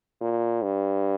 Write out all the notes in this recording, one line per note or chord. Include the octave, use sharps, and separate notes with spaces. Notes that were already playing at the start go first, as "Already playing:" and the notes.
A#2
G2